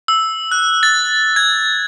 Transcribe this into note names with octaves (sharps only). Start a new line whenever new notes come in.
E6
F#6
A6
G#6